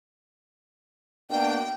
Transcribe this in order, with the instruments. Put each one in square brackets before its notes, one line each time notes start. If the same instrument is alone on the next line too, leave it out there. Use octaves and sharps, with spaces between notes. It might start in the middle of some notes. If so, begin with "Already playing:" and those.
[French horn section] B2 A#3 D4 [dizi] G5